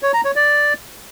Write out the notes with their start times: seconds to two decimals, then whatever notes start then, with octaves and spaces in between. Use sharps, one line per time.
0.03 C#5
0.14 A#5
0.25 C#5
0.36 D5